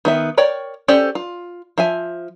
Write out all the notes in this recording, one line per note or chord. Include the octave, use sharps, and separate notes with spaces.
D#3 B3 E5
A#4 C#5 D5 G5
C#4 G4 A4 C5 D5
F4
F3 E5 G#5